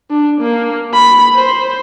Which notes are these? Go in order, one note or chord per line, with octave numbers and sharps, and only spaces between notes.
D4
A#3
B5
C5